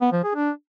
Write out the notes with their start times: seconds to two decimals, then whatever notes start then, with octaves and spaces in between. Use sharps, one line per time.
0.01 B3
0.12 F3
0.24 G#4
0.35 D4